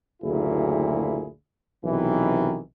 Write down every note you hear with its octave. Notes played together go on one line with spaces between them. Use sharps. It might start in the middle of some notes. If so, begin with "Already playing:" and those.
F#1 D2 A#2 E4 G#4
B1 C3 D#3 E3